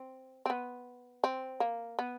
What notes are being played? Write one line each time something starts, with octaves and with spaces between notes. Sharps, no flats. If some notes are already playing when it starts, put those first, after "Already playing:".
Already playing: C4
C4
B3
C4
A#3
B3